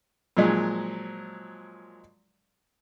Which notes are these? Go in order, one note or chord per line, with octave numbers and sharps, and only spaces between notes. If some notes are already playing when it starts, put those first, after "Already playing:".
A#2 F3 F#3 G#3